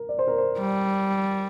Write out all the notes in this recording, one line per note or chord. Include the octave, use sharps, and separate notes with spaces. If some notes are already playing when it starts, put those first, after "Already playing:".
Already playing: A#4
D5
C5
A#4
C5
G3